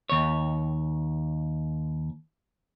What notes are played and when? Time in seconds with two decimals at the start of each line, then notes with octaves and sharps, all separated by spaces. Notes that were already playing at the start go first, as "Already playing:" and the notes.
0.10 D#2 C#5